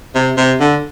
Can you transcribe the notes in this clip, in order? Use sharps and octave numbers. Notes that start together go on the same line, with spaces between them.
C3
C3
D3